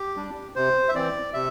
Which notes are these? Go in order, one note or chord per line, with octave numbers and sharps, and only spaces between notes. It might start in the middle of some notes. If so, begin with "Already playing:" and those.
Already playing: G4
G3 D4
C3 C5
E5
E3 C4 D5
C3 E5